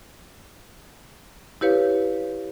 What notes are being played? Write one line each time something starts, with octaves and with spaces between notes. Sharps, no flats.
E4 G4 B4 C#5 F5